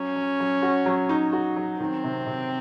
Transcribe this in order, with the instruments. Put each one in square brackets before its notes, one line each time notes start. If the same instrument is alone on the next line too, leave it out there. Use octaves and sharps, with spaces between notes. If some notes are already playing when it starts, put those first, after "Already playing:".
Already playing: [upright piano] F#3 [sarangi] C#4
[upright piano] F#3
F#3
F#4
F#3
D#4
F#4
F#3
[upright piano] D#3 [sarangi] C4
[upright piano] C3
C3